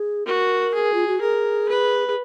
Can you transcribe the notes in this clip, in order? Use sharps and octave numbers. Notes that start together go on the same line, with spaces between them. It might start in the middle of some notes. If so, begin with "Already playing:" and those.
Already playing: G#4
F#4 A#4
G#4
F4
F#4
G#4 A#4
B4
G#4